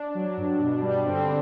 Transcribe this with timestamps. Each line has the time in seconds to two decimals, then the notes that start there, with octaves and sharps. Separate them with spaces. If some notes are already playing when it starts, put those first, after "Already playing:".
Already playing: D4
0.15 F#3
0.37 G2
0.60 B2
0.82 G3
1.05 D3 C4
1.21 D4